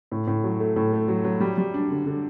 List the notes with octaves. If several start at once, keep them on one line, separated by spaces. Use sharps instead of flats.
A2
A2
F#3
A3
A2
A3
F#3
F#3
G3
G3
D4
D3
D3